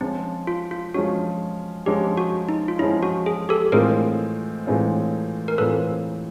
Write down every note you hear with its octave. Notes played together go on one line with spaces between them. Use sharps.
F3 G#3 C4 C#4
F4
F4
F3 G#3 C#4 F#4
F3 G#3 C#4 G4
F#4
D#4
F4
F3 G#3 C#4 E4
F#4
G#4
G4 A4
A2 E3 G#3 C4 F4 G#4 A#4
A2 E3 G#3 C4 F4
A#4
A2 E3 G#3 C4 F4 A4 B4